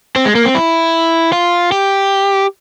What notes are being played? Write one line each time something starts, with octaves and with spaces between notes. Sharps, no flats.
C4
G#3
A#3
C4
E4
F4
G4